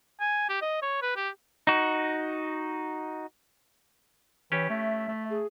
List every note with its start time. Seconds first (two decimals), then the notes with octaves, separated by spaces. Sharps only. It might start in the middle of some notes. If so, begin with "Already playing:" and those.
0.20 G#5
0.49 G4
0.62 D#5
0.82 C#5
1.02 B4
1.16 G4
1.67 D#4 F#4
4.52 E3 C#4 G4 C#5
4.70 A3 E5
5.08 A3
5.30 G#4